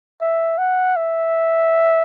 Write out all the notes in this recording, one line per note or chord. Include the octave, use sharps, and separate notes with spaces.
E5
F#5
E5